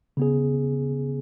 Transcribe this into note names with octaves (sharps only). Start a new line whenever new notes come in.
C#3 B3 G#4